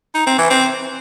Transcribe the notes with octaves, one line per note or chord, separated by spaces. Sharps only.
D#4
C4
E3
C4